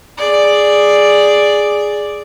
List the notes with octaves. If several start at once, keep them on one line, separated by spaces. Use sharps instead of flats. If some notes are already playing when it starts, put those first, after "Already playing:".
G#4 D5